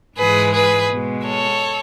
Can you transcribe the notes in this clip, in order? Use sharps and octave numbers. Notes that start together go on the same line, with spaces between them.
G#2 E3 G#3 G#4 B4
G#4 B4
B2
G#3
A4 C#5